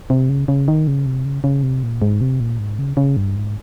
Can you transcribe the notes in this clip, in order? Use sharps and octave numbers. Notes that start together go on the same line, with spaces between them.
C3
C#3
C#3
D#3
C#3
C3
C#3
C#3
C3
A#2
G#2
C3
A#2
G#2
C#3
C#3
G2
G#2